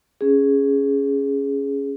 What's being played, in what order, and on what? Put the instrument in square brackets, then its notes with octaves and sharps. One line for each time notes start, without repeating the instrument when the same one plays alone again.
[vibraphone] C#4 G#4